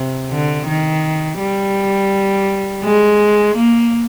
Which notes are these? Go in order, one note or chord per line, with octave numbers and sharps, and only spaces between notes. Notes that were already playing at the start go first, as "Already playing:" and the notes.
Already playing: C3
D3
D#3
G3
G#3
A#3